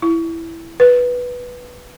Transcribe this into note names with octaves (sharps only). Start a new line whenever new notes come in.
E4
B4